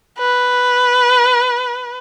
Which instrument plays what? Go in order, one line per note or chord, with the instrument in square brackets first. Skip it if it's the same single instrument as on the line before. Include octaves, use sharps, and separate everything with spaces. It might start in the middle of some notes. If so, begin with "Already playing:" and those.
[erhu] B4